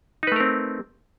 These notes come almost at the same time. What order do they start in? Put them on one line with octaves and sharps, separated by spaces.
D#4 B4 A3 A#4 C4